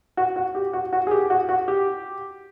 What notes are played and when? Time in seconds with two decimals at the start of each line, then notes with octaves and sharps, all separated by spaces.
0.17 F#4
0.36 F#4
0.55 G4
0.73 F#4
0.93 F#4
1.07 G#4
1.11 G4
1.30 F#4
1.49 F#4
1.68 G4